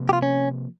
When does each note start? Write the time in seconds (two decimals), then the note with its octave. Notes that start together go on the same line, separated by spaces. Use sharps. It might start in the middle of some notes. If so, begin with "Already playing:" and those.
Already playing: C3 F3 A#3
0.09 G4
0.13 F4
0.22 C#4